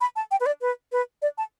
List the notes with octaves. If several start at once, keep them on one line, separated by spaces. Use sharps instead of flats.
B5
A5
G5
B4
D5
B4
B4
D5
A5